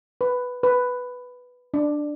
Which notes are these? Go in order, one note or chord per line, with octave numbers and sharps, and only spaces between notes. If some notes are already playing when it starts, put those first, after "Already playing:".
B4
B4
D4